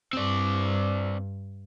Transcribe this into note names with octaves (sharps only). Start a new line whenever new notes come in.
G2 C4 D5